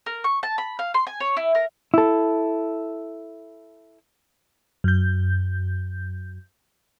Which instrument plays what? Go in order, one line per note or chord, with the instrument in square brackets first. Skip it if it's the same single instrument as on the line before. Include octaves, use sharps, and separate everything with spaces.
[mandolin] A#4
C#6
A5
B5
F5
C6
G#5
C#5
E4
A#4
[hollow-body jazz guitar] E4 A4
[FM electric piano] F#2 G6